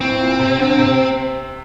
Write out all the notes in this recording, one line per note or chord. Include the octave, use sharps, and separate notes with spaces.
A2 C4
A#2
C3
D3
C3